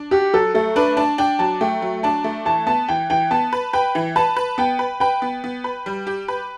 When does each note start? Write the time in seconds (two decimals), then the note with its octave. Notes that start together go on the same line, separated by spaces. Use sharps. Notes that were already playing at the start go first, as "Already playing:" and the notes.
Already playing: D4
0.11 F#4 G4
0.34 F#3 A4
0.54 A3 A4
0.76 D4 B4
0.97 D4 A5
1.18 D4 G5
1.39 F#3 A5
1.61 A3 G5
1.82 F#3
2.03 D4 A5
2.24 A3
2.45 E3 A5
2.67 B3 A5
2.88 E3 G5
3.10 E3 G5
3.31 B3 A5
3.53 B4
3.73 B4 G5
3.95 E3
4.16 B4 A5
4.36 B4
4.58 B3 G5
4.79 B4
5.00 B4 G5
5.22 B3
5.44 B3
5.64 B4
5.86 G3
6.07 G4
6.28 B4